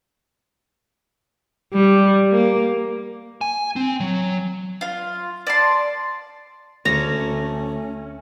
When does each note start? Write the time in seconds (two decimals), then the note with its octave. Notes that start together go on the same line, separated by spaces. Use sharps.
1.74 G3
2.32 A#3
3.41 G#5
3.76 C4
4.00 F#3
4.81 F4 F5
5.47 D5 A5 C6
6.86 D2 A3 C#4 A#5